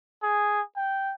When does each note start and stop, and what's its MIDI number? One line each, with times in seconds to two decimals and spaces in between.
0.23 0.61 68
0.76 1.14 79